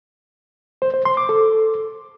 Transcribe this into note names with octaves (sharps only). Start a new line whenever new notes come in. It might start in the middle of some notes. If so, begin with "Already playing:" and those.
C5
C5
C6
D6
A4